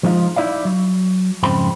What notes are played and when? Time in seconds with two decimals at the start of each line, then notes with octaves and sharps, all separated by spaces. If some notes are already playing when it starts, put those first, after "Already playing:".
0.03 F3 G#3 D#4 F4
0.36 D#4 E4 D5 F5
0.65 F#3
1.43 F2 G#2 C#3 C4 B5